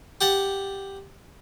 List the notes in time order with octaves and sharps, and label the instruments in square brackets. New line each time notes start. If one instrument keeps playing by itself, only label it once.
[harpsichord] G4 F#5 A5